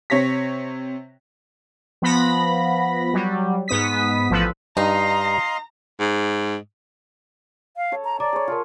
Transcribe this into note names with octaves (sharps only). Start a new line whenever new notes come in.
C3 C#5 A#6 B6
F3 B3 B5 A#6
F#3 G3
G#2 B3 D#6 B6
A1 F3 A4 B4
G2 D#4 D#5 F5 A#5 C6
G#2
F5
A4 C#5
A#5
D5 A5 A#5 D6
G#4 C#5
F4 A#4 A5 C6